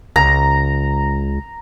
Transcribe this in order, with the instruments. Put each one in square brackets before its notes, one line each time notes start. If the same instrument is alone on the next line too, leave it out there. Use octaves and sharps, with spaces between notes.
[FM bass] C#2 [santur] A#5